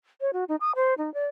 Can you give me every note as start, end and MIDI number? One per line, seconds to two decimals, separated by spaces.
0.21 0.31 73
0.33 0.44 66
0.49 0.56 63
0.61 0.72 87
0.75 0.94 72
0.98 1.12 63
1.14 1.26 74